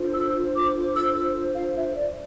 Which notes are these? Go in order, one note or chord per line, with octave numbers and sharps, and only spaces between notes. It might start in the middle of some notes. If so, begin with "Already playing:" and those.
Already playing: D4 F4 A4 C5
E6
D6
E6
E6
F5
E5
D5